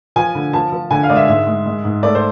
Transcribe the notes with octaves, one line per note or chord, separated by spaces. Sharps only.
F3 G#5
D3
F3 A5
F3
D3 G#5
F5
G#3 D5
E5
G#2 E5
G#3
G#3
G#2
A3 D5
C5